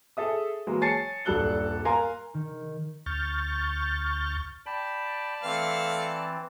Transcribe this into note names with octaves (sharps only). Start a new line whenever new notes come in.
G#4 A4 E5 D#6
E3 F#3 G#3 A#3
C#5 G#5 A5 A6 C7 C#7
D#1 G2 G3 A4 F#6 G7
A#4 F5 G#5 A#5 C6
D#3
D2 C#6 F6 G6 A6
D5 G5 A5 B5
E3 A3 C4 F5